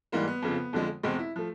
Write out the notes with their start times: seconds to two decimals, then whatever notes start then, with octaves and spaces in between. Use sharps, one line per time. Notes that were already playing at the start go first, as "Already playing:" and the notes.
0.12 G#2 E3 G3 A#3
0.28 B3
0.43 F2 C#3 F3
0.73 F2 D3 F3 G#3
1.03 E2 B2 G#3 C4
1.19 E4
1.36 F3 A3